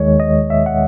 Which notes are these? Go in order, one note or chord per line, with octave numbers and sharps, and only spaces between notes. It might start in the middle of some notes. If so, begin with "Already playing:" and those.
Already playing: D#2 D#3 G#3 C#5
D#5
E5
F#5